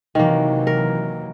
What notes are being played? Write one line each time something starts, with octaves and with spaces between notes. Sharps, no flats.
C3 D#3 E3 F#3 A#3
A#4